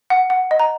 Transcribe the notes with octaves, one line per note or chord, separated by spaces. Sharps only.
F#5
F#5
D#5
A#5